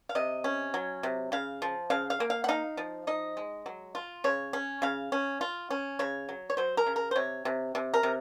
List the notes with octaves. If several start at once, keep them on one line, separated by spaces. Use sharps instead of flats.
F5
C3 D#5
C#4
F#3
C3
C#3 F5
F3
C#3 F5
F5
A#3
F5
F#5
D#4 F5
F3
D#4 D#5
G#3
F#3
F4
C#3 C#5
C#4
C#3 F5
C#4
F4
C#4
C#3 C#5
F#3
C#5
F#3 C5
A#4
C#3
A#4
C5
C3 C#5
C3
C3
A#4
C3